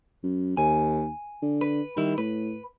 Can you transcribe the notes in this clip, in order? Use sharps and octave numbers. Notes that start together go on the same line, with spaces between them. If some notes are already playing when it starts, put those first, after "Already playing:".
F#2
D#2 G#5
D3
B4
D#3 G3 E4
A2 B4